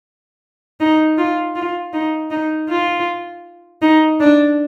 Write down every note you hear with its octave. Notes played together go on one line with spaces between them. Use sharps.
D#4
F4
F4
D#4
D#4
F4
D#4
D4